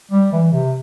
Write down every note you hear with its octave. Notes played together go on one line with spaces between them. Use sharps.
G3
E3
C3